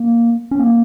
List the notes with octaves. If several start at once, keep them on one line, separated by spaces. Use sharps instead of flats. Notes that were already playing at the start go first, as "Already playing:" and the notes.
Already playing: A#3
C#4
A#3